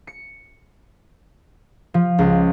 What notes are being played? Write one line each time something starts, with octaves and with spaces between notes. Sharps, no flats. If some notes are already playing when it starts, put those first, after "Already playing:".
C#7
F3
C#2